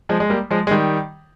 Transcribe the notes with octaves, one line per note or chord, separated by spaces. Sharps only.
F3 G#3
G#3
G3 A#3
F3 G#3
G#3
D#3 G3